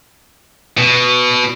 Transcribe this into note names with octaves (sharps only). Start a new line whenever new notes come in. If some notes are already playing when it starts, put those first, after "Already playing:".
B2